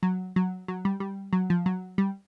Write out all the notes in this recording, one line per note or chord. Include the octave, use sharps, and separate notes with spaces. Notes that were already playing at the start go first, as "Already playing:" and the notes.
F#3
F#3
F#3
G3
G3
F#3
F3
F#3
G3